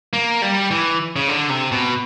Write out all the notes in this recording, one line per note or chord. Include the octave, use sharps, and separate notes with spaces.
A#3
G3
E3
C#3
D3
C3
B2